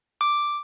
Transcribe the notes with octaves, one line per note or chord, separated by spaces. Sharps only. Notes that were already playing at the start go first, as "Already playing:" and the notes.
D6